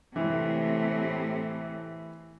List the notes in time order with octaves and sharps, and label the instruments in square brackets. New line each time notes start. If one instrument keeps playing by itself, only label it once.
[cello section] A2 C3 [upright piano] E3